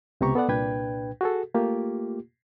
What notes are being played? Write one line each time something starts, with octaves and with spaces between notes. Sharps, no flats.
C#2 C3 B3 G4 A#5 C#6
B3 A4 B4 D5 F#5
C2 A#2 D4 B4 G5 G#6
F#4 G#4 A4
A3 A#3 F4 G4